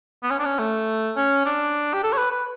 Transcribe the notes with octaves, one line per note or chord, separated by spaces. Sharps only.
B3
C#4
D4
C#4
A3
C#4
D4
G4
A4
C#5
B4
B4